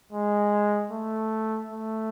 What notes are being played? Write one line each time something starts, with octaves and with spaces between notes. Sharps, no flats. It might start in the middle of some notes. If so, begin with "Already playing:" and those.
G#3
A3
A3